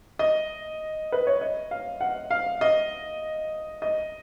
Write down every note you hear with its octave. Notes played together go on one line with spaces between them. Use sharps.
D#5
B4
C#5
D#5
F5
F#5
F5
D#5
D#5